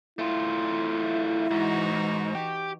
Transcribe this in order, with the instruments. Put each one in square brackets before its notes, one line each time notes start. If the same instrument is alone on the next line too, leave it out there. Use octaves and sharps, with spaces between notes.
[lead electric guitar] A3 F4 [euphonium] E4
[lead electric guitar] G#2 [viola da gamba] E3 D#4 F#4
[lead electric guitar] G4